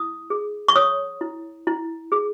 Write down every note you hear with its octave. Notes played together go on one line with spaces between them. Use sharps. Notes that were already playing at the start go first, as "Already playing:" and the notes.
Already playing: E4 D#6
G#4
C#6
C#5 D#6
E4
E4
G#4